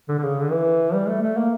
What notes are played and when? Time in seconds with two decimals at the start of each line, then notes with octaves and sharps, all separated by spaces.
0.09 D3
0.19 D3
0.23 C#3
0.41 D3
0.51 E3
0.94 G3
1.08 A3
1.22 A3
1.37 A#3